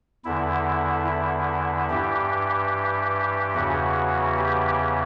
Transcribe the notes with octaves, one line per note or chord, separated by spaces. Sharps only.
E2 D3 E4
E4
G2 E3 G4
E2 C#3 E3 F#4
G4